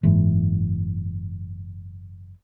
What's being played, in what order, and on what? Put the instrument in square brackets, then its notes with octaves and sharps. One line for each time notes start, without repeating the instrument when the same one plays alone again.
[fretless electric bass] F#1 G#2 E3